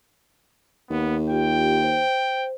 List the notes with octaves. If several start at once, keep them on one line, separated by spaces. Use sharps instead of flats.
D#2 B3
F4 G4 G5
C5